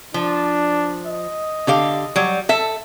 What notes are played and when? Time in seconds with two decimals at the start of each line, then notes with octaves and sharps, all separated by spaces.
0.14 F3 D4
1.06 D#5
1.67 D3 G4 F5
2.16 F#3 G3
2.49 A4 E5